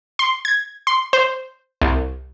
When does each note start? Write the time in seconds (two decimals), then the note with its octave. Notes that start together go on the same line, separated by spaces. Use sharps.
0.19 C6
0.45 G#6
0.87 C6
1.13 C5
1.81 C2